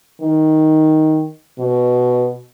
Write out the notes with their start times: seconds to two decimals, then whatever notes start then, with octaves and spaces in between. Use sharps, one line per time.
0.21 D#3
1.59 B2